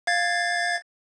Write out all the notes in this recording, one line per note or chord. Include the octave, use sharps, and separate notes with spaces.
F5 G#6 A6